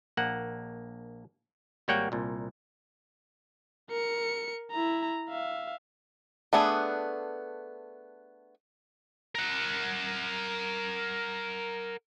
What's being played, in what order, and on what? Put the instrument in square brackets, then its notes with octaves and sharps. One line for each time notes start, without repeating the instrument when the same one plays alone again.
[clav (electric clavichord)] A#1 A#3 F#5
G#1 G3 A#3 C#5 F#5 G5
C2 A#2
[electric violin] A#4 C#7
E4 A#5
E5 F5
[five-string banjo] A3 B3 D4 G#4
[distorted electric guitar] A#4 F#5